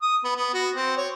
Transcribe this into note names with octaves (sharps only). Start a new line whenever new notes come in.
D#6
B3
B3
F#4
C4
C#5